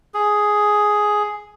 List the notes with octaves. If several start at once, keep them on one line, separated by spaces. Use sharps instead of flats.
G#4